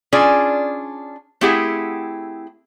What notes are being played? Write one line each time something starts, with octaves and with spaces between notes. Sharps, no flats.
C#4 D4 F4 G#4 D5
A3 C4 E4 G4 G#4 F#5